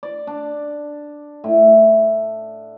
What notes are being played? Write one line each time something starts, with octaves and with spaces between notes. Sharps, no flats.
D5
D4
A2